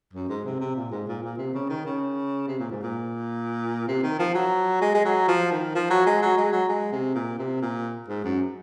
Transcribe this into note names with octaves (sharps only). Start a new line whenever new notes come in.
F#2
G#2
C3
C3
A#2
G#2
A#2
A#2
C3
C#3
D#3
C#3
C3
A#2
G#2
A#2
C3
D#3
F3
F#3
G#3
G#3
F#3
F3
D#3
F3
F#3
G#3
F#3
G#3
F#3
G#3
C3
A#2
C3
A#2
G#2
F#2